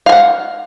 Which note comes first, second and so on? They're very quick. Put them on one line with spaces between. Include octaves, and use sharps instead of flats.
F5 G#5 F#5